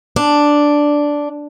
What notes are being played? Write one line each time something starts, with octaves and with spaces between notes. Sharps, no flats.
D4